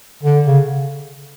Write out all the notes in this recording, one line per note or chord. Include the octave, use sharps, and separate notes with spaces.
D3
C#3